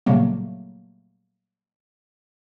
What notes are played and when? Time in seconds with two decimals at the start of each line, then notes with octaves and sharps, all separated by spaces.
0.06 A#2 C#3 F#3 G3 A3 A#3